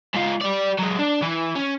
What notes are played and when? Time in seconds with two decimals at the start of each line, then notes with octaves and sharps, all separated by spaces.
0.14 G#2 F4
0.42 G4 D5
0.79 F#3 G#3
0.99 D4
1.23 E3
1.55 C#4